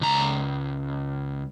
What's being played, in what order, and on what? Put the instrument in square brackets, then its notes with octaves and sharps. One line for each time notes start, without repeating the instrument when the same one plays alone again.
[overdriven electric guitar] C#2 A#5